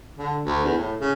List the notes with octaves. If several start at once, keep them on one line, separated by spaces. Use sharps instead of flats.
D3
D2
E2
A2
C#3